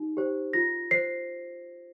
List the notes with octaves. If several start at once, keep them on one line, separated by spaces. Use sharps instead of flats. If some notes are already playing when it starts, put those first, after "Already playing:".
Already playing: D#4 G4
G4 C5
F4 A#6
C5 C7